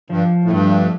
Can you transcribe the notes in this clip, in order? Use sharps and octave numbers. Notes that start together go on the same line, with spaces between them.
G2 F3
A2
G2 A3